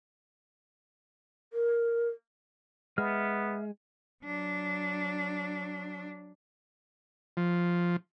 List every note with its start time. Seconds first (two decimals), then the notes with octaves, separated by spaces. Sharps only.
1.53 A#4
2.98 G#3 B3 E5 F6
4.24 F#3 D4
7.37 F3